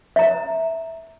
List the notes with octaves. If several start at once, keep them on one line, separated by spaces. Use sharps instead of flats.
E5 A#5